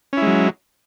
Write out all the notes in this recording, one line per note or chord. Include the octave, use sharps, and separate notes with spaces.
F#3 G#3 C#4 E4